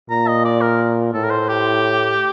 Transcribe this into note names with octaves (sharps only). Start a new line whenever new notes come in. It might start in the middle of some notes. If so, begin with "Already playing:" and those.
A#2 A#5
D#5
D5
A#4
A2 A4
A#4
C5
G4